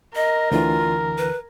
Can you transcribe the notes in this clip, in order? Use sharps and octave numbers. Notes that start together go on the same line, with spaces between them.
A#4 D#5
D2 D3 E3 F4
B4